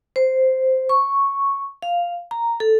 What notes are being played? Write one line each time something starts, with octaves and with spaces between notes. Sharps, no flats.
C5
C#6
F5
A#5
A4